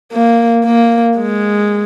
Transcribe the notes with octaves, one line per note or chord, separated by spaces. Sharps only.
A#3
A#3
G#3